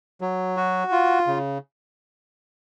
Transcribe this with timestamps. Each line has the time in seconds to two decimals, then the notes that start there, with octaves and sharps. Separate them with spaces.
0.21 F#3
0.57 F#4
0.92 F4
1.27 C#3